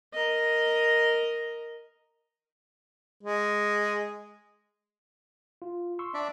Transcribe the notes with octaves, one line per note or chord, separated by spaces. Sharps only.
A#4 D#5
G#3
F4
C6 C#6 E6
D4 D5 E5